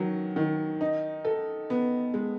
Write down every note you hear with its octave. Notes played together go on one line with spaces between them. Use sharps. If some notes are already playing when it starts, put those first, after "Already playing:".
Already playing: D#3 F#3
D#3
D#4
A4
B3
G#3